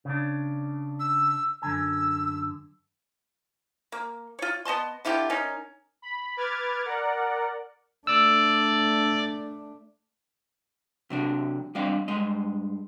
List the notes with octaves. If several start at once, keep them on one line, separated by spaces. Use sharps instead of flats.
C#3 D4
E6
F#2 D3 G#5 E6
A#3
F4 C#5
B3 D#5 A5 C6
D3 E4 F4 G4
C#4 D#4 A#4
B5
B4 D6 F6 G#6 A6
A#4 D5 F#5
A3 D4 D5 E6
C3 F#3 D4
G3 C4 D4 D#5 F5
G2 G#3 D#5